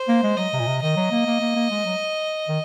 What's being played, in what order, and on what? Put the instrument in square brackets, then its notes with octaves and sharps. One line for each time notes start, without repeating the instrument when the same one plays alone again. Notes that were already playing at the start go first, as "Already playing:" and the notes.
Already playing: [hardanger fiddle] C5
[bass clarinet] A#3
G#3
[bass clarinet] F#3 [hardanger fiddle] D#5
[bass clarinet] C3
A#2
C3
[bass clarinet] D#3 [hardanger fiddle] D#5
[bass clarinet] F#3
A#3
A#3
A#3
A#3
G#3
F#3
D#3